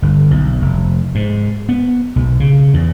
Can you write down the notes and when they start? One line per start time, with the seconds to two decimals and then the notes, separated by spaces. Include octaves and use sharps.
0.02 G1
0.31 B1
0.62 F1
1.15 G#2
1.69 B3
2.16 B1
2.40 C#3
2.74 E2